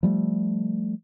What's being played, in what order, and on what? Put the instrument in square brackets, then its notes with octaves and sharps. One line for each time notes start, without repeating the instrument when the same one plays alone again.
[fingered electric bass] F3 G3 A3